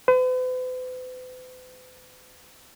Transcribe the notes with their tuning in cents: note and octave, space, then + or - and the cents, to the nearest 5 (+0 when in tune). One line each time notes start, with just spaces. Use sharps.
B4 +45